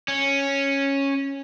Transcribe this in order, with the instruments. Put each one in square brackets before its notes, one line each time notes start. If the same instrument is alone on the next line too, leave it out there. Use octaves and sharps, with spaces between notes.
[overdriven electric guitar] C#4